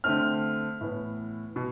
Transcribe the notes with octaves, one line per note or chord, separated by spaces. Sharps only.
D3 A3 C4 F6
A2 E3 B3
B2